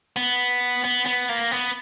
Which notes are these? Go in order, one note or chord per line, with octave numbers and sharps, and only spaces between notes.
B3
B3
B3
A#3
B3